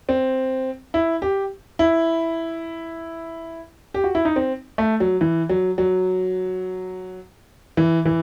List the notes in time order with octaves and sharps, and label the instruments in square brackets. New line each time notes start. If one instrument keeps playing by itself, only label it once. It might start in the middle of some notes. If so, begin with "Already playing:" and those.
[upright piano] C4
E4
G4
E4
G4
F#4
E4
D#4
C4
A3
F#3
E3
F#3
F#3
E3
E3